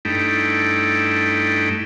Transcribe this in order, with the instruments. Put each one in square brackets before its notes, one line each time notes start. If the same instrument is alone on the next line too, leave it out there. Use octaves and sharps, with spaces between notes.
[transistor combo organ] G2 A3 D#4 E4 G5